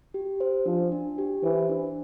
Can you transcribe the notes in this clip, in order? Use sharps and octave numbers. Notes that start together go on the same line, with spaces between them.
G4
C5
F3 D4
D4
G4
E3 C5
D4